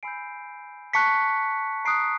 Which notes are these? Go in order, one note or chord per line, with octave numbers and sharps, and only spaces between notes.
G#5 B5 E6 G6 C7 D7
A5 C#6 F#6 B6 C#7
A#5 D#6 F#6 C7 D7